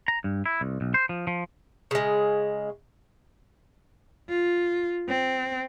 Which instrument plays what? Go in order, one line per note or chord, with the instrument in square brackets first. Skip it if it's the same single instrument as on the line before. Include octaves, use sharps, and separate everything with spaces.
[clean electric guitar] A#5
G2
E4
C2
B1
C5
F3
F3
[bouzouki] C#3 G#3
[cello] F4
C4